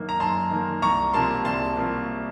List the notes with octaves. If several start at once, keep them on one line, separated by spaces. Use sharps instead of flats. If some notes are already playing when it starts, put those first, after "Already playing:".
Already playing: F#2 D#3 A#3
A#5
F#2 A5 C6
D#3 A#3
C2 A#5 C#6
C3 F3 A#3 A5 C6
C2 A5 C6
C3 F3 A#3